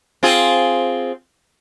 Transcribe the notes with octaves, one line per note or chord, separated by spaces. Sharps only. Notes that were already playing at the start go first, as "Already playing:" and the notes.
C4 F4 G#4